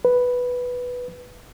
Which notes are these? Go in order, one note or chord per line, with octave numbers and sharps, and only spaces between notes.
B4